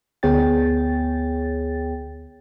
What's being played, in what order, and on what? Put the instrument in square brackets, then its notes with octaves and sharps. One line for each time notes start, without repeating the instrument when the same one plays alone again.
[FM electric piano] D2 B3 G#4 C#5 G5 A6